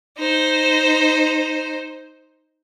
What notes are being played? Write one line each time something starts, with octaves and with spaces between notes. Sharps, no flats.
D#4 C5